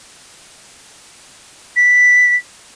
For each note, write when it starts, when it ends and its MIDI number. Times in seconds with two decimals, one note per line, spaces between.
1.76 2.35 95